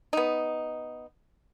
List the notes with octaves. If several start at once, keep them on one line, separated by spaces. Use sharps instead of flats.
B3 D#4